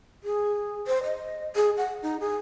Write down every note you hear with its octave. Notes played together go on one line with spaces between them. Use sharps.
G#4
C5
D#5
G#4
F#5
D#4
G#4